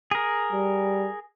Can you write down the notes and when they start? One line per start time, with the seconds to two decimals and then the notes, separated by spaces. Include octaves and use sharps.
0.11 G#4 A#4
0.52 G3